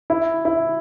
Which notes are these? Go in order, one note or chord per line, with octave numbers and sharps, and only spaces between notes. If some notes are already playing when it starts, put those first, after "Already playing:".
E4
E4